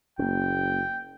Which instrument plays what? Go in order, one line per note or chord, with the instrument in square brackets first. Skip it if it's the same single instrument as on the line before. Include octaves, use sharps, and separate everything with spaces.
[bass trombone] F#1 [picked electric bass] A#3 C#4 [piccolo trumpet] G5